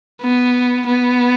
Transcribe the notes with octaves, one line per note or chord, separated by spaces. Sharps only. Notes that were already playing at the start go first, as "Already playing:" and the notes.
B3
B3